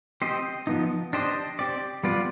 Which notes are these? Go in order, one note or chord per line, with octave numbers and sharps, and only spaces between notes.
C4 G4 C5 D#5
F3 B3 D#4
D4 G4 C5 D#5
C4 G4 D5
G3 B3 F4 B4 D5